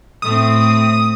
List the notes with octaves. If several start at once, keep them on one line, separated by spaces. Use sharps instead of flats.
A2 A3 C4 D#6